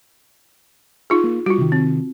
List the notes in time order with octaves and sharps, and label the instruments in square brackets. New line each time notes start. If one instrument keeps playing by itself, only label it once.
[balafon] D#4 F4 G#4
[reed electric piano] A#3
[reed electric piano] G3 [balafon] F4 F#4
[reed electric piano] C3 D#3
[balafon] C4